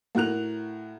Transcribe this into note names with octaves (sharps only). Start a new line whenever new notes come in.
A2 F#4 A#4 F#6 F7